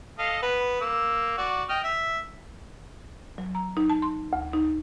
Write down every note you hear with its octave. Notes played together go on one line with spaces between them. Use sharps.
A4 D#5 F5
B3 B4
A#3 E6
F#4 D5
D#5 G5 F6
E5
F#3
A#5
D#4
A5
C6
D2
D#4